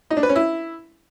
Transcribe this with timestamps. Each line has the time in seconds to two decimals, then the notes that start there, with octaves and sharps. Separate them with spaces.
0.10 D#4
0.17 D4
0.23 B4
0.29 C#4
0.36 E4